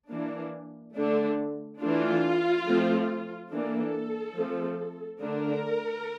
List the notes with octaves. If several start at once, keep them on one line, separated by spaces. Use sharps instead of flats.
E3 A#3 D4
D3 A3 D4
E3 A3 D4 F4
F3 A3 C4
E3 A#3 D4 A4
F3 A3 C4
D3 A3 D4 A#4